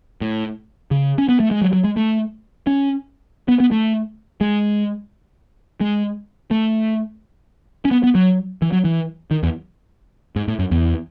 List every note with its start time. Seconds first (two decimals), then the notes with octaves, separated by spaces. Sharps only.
0.21 A2
0.91 C#3
1.18 C#4
1.29 B3
1.40 A3
1.51 G#3
1.62 F#3
1.73 F#3
1.84 G#3
1.96 A3
2.67 C#4
3.48 B3
3.60 B3
3.71 A3
4.41 G#3
5.81 G#3
6.51 A3
7.85 C#4
7.91 B3
8.03 B3
8.15 F#3
8.62 E3
8.72 F#3
8.85 E3
9.31 D#3
9.43 E2
10.36 G#2
10.48 A2
10.59 F#2
10.71 E2